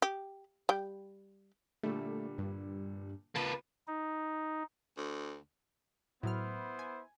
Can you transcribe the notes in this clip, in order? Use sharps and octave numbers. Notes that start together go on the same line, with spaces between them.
G4
G3 G5
A#2 D3 G3 A3
G2
C#2 A#3 B4 A5
D#4
D2
A2 F#3 B3 E4 C5 F6
G#5